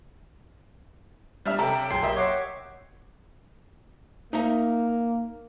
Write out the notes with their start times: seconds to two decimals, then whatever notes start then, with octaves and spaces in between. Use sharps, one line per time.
1.46 G3 D4 E5 F6
1.59 B1 C3 A4 G5 A#5
1.90 B1 F#2 G#4 G5 C6 C7
2.03 A#3 G4 D#5 E5
2.16 C#5 F#5 D6 C7
4.33 A#3 D#4 E5 A#5